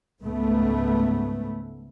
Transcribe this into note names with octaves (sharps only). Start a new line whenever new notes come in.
C#2 G#2 A3 B3